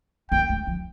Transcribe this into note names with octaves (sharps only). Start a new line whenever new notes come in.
A#3 G5
A3
F3